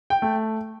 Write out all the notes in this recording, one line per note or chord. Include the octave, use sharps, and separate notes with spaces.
G5
A3